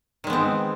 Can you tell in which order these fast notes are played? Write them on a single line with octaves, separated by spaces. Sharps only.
D#3 G#3 B3 C4